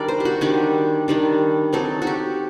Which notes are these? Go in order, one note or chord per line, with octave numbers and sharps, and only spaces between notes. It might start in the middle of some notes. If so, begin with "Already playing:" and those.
Already playing: D#3 G3 D4 A#4 D5
C5
G4
F#4
D#3 G3 D4 G4
D#3 G3 D4
F#3 C4 D#4 A4
F#4
G4